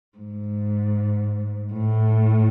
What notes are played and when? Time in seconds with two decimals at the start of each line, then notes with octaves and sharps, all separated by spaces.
0.18 G#2
1.73 A2